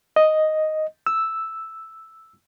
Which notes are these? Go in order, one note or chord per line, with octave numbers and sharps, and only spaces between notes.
D#5
E6